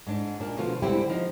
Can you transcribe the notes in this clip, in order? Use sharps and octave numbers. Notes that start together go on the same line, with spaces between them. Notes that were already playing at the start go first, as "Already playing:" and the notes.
G#2 D4
A#2 D4 A#4
B2 D3 F3 A3 F4
D3 G3 G#3 C4 E4 G4
F3 D#4